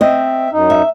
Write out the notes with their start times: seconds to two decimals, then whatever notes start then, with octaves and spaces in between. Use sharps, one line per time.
0.01 C4 D#5 E5
0.53 F#2 D#4
0.70 E5